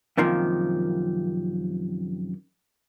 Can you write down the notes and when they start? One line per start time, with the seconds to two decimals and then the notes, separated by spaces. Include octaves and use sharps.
0.17 F#2 C3 D#3 F3 A#3